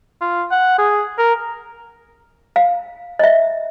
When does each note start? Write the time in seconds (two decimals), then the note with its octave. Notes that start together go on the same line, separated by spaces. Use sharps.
0.21 F4
0.51 F#5
0.79 G#4
1.18 A#4
2.56 F5
3.19 D#5 E5